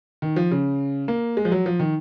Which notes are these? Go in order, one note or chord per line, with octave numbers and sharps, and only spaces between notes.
D#3
F3
C#3
A#3
G#3
F3
F#3
F3
D#3